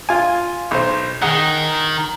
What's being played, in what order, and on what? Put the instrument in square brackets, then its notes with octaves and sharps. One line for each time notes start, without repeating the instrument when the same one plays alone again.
[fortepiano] F4 G#5
B1 C5
[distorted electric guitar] D#3 [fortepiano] G#4 F#5